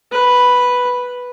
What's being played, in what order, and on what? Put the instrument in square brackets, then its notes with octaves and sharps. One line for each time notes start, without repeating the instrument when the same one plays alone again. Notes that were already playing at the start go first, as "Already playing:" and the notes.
[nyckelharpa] B4